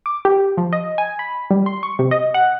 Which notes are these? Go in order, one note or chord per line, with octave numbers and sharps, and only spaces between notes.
D6
G4
F3
D#5
G#5
B5
G3
C6
C#6
C3
D#5
F#5